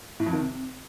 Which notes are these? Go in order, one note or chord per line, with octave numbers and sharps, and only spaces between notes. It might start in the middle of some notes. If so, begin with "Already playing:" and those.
A2
F2
D#3
C3